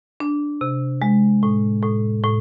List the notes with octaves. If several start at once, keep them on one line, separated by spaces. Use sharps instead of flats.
D4
C3
G#3
A2
A2
A2